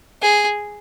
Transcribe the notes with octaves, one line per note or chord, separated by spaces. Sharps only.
G#4